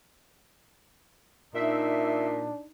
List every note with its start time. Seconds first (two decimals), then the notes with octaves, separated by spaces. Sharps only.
1.55 A#2 D4 D#4 E5